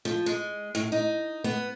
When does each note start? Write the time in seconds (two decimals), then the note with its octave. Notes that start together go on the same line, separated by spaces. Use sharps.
0.05 F3
0.26 G#3
0.75 A2
0.92 D#4
1.44 B3